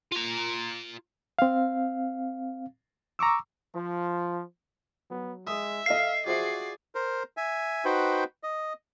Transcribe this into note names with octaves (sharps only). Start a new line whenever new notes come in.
F4 A#5
C4 F5
A#5 C#6 D6 E6
F3
F#3 B3
G#3 E5 D#6
A4 D#5 F5 C7
F4 F#4 G#4 C5 D5 E5
A#4 C5
E5 G#5
D#4 F#4 B4 C5 G5
D#5